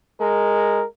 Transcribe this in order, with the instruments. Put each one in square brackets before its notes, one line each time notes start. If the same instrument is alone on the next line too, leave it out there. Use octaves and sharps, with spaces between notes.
[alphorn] G#3 [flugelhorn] A#4